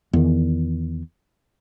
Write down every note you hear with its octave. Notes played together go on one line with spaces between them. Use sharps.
E2 D#3